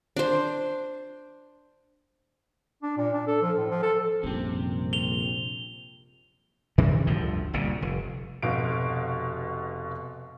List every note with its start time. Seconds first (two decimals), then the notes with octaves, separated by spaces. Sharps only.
0.16 D4 C5
2.82 D4
2.97 A#2
3.13 D4
3.27 A4
3.42 F3
3.58 A2
3.70 F3
3.83 A4
4.23 A#1 F#2 C3 G3 C4
4.93 F7 G7
6.78 G2 C3 D#3 E3
7.07 G1 D2 A2 F3
7.53 G1 C2 A#2 C#3
7.82 F1
8.43 F1 B2 F5 D7